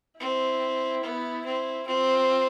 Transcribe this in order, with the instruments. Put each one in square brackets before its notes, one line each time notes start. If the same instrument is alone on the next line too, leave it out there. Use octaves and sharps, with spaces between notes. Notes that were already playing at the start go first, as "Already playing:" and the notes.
[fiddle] C4 [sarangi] E4
[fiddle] B3
C4
[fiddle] C4 [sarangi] F4